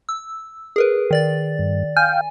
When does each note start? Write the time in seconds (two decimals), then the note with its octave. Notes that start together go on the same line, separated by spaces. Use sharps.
0.09 E6
0.76 G#4 A#4 B4
1.11 D#3 D5 A6
1.59 G2
1.97 F5 G5 G#5